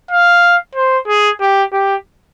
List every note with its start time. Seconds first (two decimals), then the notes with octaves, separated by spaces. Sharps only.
0.11 F5
0.75 C5
1.08 G#4
1.41 G4
1.73 G4